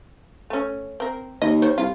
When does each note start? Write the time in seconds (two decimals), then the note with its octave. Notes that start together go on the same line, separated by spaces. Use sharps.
0.50 A3 C#4
1.00 C4 A#4
1.42 D#2 D#5
1.62 D#3 C5 C#5
1.78 C2 F4